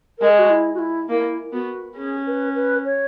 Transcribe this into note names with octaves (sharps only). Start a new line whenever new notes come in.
G#3 A#4
G#4
F#4
E4
F#4
E4
A#3 E4
B3 F#4
C#4 G#4
B4
B4
C#5